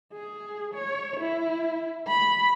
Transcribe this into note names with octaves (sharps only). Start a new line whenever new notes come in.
G#4
C#5
E4
B5